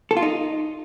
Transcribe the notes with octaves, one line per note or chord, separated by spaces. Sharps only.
A4
F4
D#4